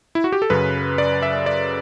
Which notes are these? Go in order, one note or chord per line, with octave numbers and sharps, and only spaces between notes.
E4
F#4
G4
A4
F#2 C#3 F#3 B4
D5
E5
D5